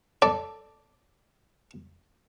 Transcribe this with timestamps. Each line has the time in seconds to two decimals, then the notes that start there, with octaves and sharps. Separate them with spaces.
0.22 A4 D5